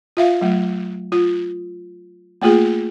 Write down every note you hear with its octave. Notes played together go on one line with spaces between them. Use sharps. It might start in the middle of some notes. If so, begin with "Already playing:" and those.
F4 E5 F5
F#3 A3
F4
A3 A#3 F4 G#4